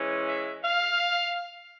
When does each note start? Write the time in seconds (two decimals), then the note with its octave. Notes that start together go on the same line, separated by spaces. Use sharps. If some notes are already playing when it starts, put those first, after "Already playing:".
Already playing: E3 G#3 C#4
0.28 E5
0.64 F5